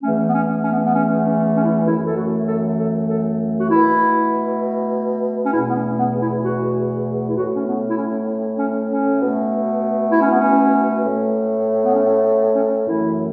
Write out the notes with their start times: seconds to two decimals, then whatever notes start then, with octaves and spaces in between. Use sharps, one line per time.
0.03 E2 E3 A3 C#4
0.30 B3
0.34 C#4
0.64 C#4
0.72 B3
0.86 B3
0.95 C#4
1.26 C#4
1.57 C#4
1.64 E4
1.72 C#4
1.87 F#2 E3 A3 E4
2.07 A4
2.17 F#4
2.48 A4
2.79 A4
3.10 A4
3.60 F#4
3.70 B2 A3 E4
5.46 C#4
5.53 E2 B2 A3 E4
5.70 B3
5.76 C#4
5.99 B3
6.22 E4
6.45 F#4
7.29 E4
7.37 A2 A3 F#4
7.56 C#4
7.67 B3
7.90 E4
7.98 C#4
8.59 C#4
8.90 C#4
9.21 B2 A3
10.12 E4
10.22 C#4
10.32 B3
10.41 C#4
11.04 A2 A3
11.86 B3
11.95 C#4
12.56 C#4
12.87 F#2 E3 A3 E4